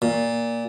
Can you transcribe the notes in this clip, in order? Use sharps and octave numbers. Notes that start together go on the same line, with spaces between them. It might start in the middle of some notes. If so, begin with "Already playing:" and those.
A#2